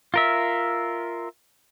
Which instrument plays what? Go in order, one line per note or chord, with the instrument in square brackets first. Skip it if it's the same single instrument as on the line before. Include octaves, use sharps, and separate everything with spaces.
[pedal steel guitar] F4 A#4 E5